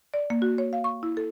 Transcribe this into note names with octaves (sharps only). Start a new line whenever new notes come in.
D5
A#3
F#4
C#5
F5
C#6
E4
A4